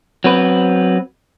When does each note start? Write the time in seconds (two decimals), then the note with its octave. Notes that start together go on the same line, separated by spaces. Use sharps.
0.24 F#3 C4 B4